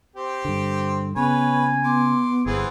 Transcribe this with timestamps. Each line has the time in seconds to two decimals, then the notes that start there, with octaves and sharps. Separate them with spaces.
0.16 C4 G4
0.45 G2 D3
1.16 C#3 B3 B4 C#5 G#5
1.84 B3 C6 D6
2.46 G1 E3 B3 C4 G#4